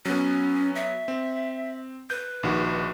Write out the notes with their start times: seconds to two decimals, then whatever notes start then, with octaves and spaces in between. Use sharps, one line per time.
0.05 F#3 B3 C#4
0.75 E5
1.08 C4
2.10 B4 G6
2.43 A#1 D#3 F#4